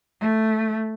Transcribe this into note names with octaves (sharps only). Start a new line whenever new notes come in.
A3